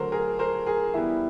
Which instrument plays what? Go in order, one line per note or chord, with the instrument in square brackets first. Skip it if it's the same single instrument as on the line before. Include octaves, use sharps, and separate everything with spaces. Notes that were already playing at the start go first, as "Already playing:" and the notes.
Already playing: [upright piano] D3 F#3 A3 A#4 C5
G#4 A#4
A#4 C5
G#4 A#4
E3 G3 B3 E4